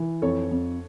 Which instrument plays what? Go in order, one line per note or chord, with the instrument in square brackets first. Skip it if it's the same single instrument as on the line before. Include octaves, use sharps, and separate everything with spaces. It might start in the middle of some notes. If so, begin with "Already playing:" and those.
Already playing: [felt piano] E3
[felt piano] F2 [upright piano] A4 C#5
[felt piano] F2